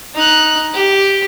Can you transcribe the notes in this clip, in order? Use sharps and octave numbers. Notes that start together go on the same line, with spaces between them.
D#4 F#6
G4